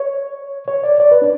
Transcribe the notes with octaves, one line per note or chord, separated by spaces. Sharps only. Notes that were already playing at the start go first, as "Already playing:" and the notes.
Already playing: C#5
C#5
D5
D5
B4
D4